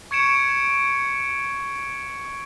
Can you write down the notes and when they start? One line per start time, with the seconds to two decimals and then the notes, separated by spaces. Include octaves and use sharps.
0.11 C#6 G#6 C#7 D7 E7